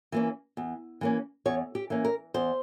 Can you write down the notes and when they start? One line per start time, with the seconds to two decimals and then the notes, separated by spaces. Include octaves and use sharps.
0.12 E3 A#3 C#4
0.57 E2
1.01 E3 A#3 C#4
1.45 E2 C#5
1.75 G4
1.90 E3 A#3 C#4
2.05 A#4
2.34 E2 C5